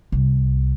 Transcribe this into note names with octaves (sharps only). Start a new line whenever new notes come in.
C2